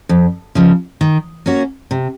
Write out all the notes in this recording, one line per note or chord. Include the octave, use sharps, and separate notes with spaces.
F2
C#3 F3
D#3
A#3 C#4 F#4
C3